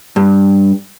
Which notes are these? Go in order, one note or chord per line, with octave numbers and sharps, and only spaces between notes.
G2